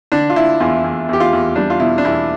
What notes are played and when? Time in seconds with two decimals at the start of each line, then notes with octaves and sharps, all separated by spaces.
0.12 D3 D4
0.30 F4
0.35 D3 E4
0.60 E2 F4
0.84 E2
1.09 E2 G4
1.20 F4
1.33 E2
1.56 G3 D4
1.70 F4
1.80 B2 E4
1.98 D4
2.04 E2 E4